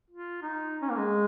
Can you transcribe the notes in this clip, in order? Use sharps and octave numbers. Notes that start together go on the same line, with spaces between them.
F4
D#4
C#4
A#3
G#3